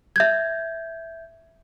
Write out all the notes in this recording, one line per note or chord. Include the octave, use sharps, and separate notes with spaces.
E5 G6 G#6